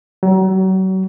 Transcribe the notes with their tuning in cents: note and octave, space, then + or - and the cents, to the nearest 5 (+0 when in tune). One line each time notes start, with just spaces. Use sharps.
F#3 +35